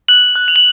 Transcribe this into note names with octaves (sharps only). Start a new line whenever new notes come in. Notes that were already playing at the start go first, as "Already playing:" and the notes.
F#6 F#7
F#6
F7
F#7